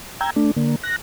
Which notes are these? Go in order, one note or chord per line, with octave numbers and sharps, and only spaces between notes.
G5 A#5 E6 G6 G#6
A3 D4
D3 A#3
F#6 A#6